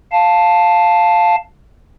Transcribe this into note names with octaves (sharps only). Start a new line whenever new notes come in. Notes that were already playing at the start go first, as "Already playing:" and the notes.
F5 A5